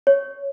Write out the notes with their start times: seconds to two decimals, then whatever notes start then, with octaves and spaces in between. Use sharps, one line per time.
0.07 C#5